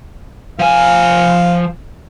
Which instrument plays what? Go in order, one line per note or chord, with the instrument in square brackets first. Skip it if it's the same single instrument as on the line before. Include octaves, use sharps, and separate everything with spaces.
[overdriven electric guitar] F3 G#5 [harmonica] F5